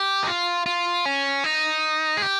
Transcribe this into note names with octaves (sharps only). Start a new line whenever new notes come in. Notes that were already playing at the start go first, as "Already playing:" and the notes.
Already playing: G4
D#4
F4
F4
C#4
D#4
G#4
G4